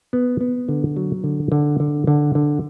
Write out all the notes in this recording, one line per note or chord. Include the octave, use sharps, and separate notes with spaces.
B3
B3
D3
F#3
D3
D3
D3
D3
D3